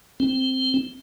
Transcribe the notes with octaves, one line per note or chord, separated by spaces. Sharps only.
C4